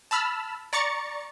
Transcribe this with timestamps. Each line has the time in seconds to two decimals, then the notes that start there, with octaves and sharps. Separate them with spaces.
0.11 A5 B5 E6 F6
0.73 D5 A#5 C#6 A6 C#7